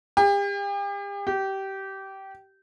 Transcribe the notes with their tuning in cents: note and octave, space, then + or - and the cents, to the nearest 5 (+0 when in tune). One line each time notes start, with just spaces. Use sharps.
G4 +40
G4 -20